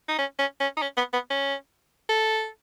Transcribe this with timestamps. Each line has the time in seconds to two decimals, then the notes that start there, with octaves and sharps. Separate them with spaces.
0.08 D#4
0.18 C#4
0.39 C#4
0.60 C#4
0.77 D#4
0.82 C#4
0.97 B3
1.13 B3
1.30 C#4
2.09 A4